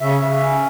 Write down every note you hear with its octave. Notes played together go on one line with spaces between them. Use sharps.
C#3 E5
C#3
C#4